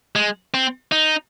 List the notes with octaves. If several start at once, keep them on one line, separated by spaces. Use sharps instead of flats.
G#3
C4
D#4